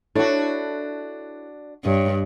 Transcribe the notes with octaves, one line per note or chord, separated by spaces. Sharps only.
D4 E4 F#4 A4 C#5
G2 C#5 D#5